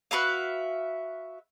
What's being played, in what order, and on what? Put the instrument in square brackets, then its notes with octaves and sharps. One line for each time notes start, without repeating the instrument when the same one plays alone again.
[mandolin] F#4 B4 E5 F5